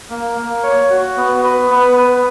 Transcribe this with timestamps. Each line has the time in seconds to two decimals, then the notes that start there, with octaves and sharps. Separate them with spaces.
0.10 A#3
0.38 A#3
0.63 C#5
0.90 F#4
1.17 B3
1.44 B4
1.71 B3
1.97 B4